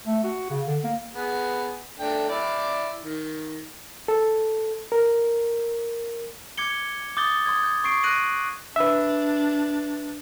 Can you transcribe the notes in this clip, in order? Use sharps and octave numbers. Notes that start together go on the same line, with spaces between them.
A3
F#4
C#3
D3
A#3
B3 G#4
A3 D4 G5
E4 D5 D6
D#3
A4
A#4
D6 G#6 C#7 G7
D6 D#6 G6 A6 G7
C6 D#6 G#6
G6
C#6 C7 D7
F#6 A#6 D7 D#7 F#7
D4 B4 E5